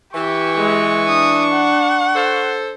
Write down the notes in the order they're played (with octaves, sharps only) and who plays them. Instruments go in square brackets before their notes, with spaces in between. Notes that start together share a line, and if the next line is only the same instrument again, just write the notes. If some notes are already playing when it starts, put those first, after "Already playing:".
[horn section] E3 [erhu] G4 [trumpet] C#6
[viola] G#3
[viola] D4 [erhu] D#6
[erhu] F#5
[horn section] A4 C5